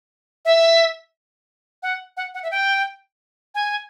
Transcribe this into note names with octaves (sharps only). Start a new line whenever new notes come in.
E5
F#5
F#5
F#5
E5
G5
G#5